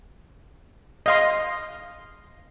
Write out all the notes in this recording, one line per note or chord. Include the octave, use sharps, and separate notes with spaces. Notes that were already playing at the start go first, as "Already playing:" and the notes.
D#5 F5 C6